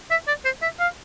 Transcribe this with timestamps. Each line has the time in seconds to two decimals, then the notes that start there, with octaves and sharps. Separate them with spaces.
0.10 E5
0.28 D5
0.45 C5
0.62 E5
0.79 F5